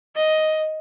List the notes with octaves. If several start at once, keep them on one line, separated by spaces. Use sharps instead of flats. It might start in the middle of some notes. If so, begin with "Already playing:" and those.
D#5